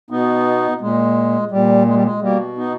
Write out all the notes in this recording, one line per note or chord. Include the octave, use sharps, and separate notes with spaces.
B2 B3 D#4
A#2 G#3
A#2 G3
G#3
G3
G#3
B2 G3 A#3
B3 D#4